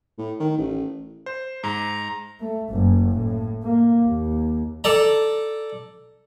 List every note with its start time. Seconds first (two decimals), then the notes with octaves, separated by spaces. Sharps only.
0.18 A2
0.40 D#3
0.58 A1
1.26 C5
1.64 G#2 A#5
2.40 A3
2.70 F#1 F#2
3.15 A2
3.63 A#3
4.03 D#2
4.84 A4 D5 A#5